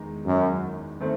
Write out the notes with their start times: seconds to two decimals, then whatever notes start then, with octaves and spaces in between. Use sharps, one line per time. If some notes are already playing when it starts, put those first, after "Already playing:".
Already playing: E2 D#3 G#3 D#4
0.26 F#2
1.00 D#3 A3 C4